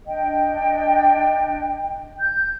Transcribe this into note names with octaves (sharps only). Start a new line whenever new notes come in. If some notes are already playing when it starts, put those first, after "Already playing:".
D4 D#5 G5
G6